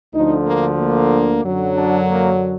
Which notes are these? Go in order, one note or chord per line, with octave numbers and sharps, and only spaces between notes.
D2 D3 F3 D#4
A#3
A#3
F#2 D3 F#3
D4
A#3